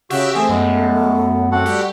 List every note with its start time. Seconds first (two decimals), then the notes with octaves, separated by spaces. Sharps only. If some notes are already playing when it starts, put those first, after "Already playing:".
0.10 C#3 F#4 G4 E5
0.35 E3 A3 C4 G#4
0.49 F#2 G#3 B3
1.52 C4 F#4 A4 F#5
1.66 G3 G4